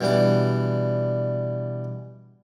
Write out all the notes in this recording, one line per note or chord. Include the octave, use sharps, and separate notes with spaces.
B2 E3 G3 D4 D6